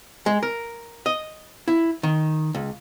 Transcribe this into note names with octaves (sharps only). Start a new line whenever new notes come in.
G#3
A#4
D#5
E4
D#3
C#2